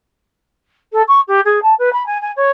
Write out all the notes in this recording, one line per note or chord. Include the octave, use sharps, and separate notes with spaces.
A4
C#6
G4
G#4
A5
B4
B5
G#5
G#5
C#5